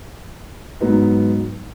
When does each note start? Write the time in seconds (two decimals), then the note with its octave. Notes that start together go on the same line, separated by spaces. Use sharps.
0.80 G#2 F#3 B3 D#4